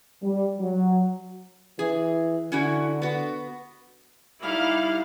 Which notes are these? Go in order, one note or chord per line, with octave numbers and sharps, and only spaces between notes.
G3
F#3
E3 G#4
D3 C#4 E4 F#4
B3 F#4
G3 D#4 E4 F5